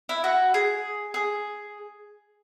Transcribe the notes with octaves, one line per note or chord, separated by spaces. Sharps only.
E4
F#4
G#4
G#4